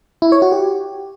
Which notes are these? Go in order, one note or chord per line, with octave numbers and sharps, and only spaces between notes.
E4
C#5
F#4
G4